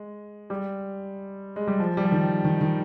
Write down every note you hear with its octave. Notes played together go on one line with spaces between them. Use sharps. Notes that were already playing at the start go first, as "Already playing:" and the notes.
Already playing: G#3
G3
G#3
G3
F3
G3
F3
D#3
D#3
D#3